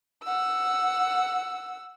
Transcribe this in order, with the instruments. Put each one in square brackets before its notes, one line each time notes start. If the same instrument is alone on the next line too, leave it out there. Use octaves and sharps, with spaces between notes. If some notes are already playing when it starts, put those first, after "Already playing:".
[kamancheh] F#5 E6